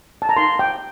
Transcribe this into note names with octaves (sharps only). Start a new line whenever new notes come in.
A5
A#5
D#4 A#4 C6
G5